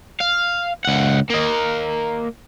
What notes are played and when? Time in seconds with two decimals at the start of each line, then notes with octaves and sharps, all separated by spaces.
0.21 F5
0.85 C#2 F#5
1.30 A#3 D#5